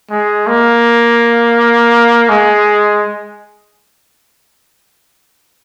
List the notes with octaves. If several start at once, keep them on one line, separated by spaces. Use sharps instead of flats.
G#3
A#3
G#3